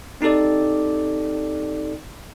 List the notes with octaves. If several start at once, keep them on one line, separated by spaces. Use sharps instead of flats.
C4 D#4 G4 A4 D5